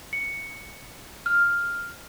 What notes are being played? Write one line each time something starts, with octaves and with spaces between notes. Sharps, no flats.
C#7
F6